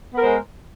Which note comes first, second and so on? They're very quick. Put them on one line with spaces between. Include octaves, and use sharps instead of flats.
B3 A#4 C5 G#3